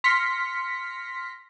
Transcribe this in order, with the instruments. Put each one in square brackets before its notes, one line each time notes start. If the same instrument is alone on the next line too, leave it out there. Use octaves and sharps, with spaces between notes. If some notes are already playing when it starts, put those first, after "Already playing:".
[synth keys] C6 F6 A#6 B6 C#7